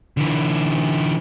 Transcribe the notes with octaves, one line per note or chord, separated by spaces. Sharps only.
D3 E3